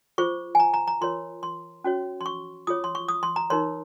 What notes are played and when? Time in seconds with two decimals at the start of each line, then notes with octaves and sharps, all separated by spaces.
0.18 F4 G#4 C5 C#6
0.55 G#5
0.60 A#5
0.74 A#5
0.87 A#5
1.01 F4 A#4 C#5 C6
1.43 C6
1.84 C#4 F#4 C#5
2.21 C6
2.26 C#6
2.67 F4 G#4 C#5 D#6
2.84 C6
2.95 C#6
3.09 D#6
3.23 C6
3.36 A#5
3.50 D#4 A#4 C#5 C6